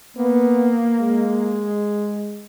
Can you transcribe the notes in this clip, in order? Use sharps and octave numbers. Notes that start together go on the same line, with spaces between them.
A#3 B3
G#3